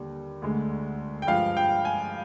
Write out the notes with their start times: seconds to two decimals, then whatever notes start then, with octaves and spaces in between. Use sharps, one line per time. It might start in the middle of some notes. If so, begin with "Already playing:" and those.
Already playing: D#2 D3 G3
0.42 D2 D3 G#3
1.22 G5
1.27 G2 F3 G#3 F5
1.57 G5
1.85 G#5